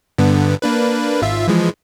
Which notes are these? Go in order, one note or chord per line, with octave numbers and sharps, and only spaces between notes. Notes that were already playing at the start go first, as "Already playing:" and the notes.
G2 D3 B3
A#3 D4 B4
G#1 F4 E5
E3 F3 G#3